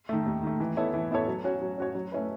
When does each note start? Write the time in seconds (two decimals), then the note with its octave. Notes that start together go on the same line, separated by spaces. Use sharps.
0.09 D#3 A3
0.26 D#2
0.43 D#3 A3
0.60 E3
0.77 B3 E4 A4 C#5
0.94 E3
1.11 B3 E4 A4 C#5
1.28 F#3
1.44 C#4 F#4 C#5
1.61 F#3
1.78 C#4 F#4 C#5
1.95 F#3
2.12 A3 C#4 E4 B4